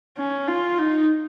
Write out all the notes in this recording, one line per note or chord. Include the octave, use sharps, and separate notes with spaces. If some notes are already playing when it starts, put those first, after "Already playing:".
C#4
F4
D#4